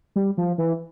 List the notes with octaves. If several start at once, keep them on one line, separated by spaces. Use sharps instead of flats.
G3
F3
E3